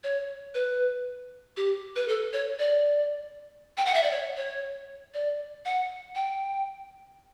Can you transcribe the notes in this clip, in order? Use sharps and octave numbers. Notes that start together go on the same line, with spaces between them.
C#5
B4
G4
B4
A4
C#5
D5
G5
F#5
E5
D5
C#5
C#5
D5
F#5
G5